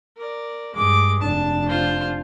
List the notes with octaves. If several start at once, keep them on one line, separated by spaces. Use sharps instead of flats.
A#4 D5
G2 G#3 D6
F1 D4 A5
F4 C5